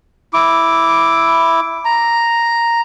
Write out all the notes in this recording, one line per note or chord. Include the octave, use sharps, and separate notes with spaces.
E4 D6
A#5